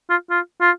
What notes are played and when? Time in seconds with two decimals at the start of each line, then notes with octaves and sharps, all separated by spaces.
0.10 F4
0.30 F4
0.61 F4